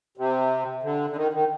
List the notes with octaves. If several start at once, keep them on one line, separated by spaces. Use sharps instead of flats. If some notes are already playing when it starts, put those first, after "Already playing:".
C3
D3
D3
D#3
D#3